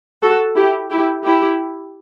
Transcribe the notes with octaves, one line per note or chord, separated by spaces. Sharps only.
F#4 A4
E4 G4
E4 G4
E4 G4